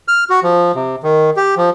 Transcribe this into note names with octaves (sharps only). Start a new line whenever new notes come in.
F6
F#4
F3
C3
D#3
G4
F3